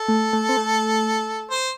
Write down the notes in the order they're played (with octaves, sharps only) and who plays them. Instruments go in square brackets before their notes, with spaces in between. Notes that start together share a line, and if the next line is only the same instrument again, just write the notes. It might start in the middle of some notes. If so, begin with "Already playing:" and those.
Already playing: [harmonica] A4
[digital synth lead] A3
A3
C4
A3
[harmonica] C5